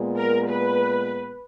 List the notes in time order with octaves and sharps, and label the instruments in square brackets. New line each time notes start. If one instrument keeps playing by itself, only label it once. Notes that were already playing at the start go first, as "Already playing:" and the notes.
Already playing: [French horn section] A#2 G#3 B3
[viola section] A#4
B4